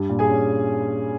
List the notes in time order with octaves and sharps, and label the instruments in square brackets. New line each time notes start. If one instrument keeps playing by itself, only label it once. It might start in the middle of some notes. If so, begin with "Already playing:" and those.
Already playing: [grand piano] G2 G3
A#2
G#4 G#5
C#4